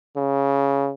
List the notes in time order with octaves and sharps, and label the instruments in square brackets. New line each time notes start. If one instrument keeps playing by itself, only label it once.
[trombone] C#3